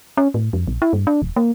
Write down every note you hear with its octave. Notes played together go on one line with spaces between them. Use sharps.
C#4
A2
F2
A#1
E4
G2
D4
D#1
A#3